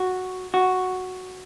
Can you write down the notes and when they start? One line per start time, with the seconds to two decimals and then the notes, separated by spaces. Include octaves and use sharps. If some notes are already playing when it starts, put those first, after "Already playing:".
Already playing: F#4
0.54 F#4